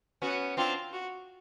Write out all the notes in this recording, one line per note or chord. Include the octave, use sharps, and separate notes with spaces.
B3 C#4 F#4
C4 D4 F4
F#4